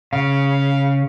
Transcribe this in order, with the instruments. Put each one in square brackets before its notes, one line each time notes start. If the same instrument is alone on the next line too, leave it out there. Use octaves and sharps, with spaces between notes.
[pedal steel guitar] C#3 [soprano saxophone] F5